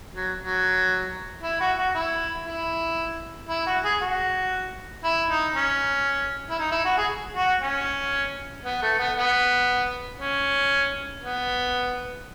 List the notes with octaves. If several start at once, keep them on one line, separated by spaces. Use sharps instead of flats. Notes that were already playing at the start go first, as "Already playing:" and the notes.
F#3
F#3
E4
F#4
F#4
E4
E4
E4
F#4
G#4
F#4
E4
D#4
C#4
E4
D#4
E4
F#4
G#4
F#4
C#4
B3
A3
B3
B3
C#4
B3